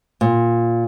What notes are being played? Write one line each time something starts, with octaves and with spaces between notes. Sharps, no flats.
A#2